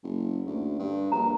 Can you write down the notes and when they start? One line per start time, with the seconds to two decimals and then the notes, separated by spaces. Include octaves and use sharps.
0.03 F#1
0.47 D2
0.79 G2
1.12 A#1 A#5